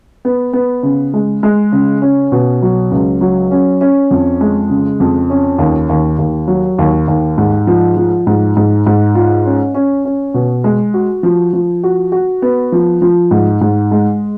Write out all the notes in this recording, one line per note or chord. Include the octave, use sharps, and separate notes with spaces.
B3
B3
C#3
G#3
G#3
C#3
C#4
B2
F#3
C#2
F#3
C#4
C#4
F2
G#3
C#3
F2
C#4
D#2
D#2
D#2
F#3
D#2
D#2
G#2
F3
F3
G#2
G#2
G#2
F4
C#4
C#4
C#4
B2
G#3
F#4
F3
F3
F#4
F#4
B3
F3
F3
G#2
G#2
G#3